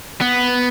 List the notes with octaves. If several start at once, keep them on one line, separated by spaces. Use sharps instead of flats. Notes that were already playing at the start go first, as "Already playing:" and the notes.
B3